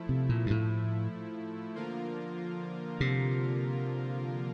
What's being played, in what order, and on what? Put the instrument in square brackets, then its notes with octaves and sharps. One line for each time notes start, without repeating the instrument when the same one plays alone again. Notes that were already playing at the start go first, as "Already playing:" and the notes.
Already playing: [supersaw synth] F3 A3 E4
[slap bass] C3
A#2
G2
A2
[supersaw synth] D3 F3 A#3 F4 A#4
[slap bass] C3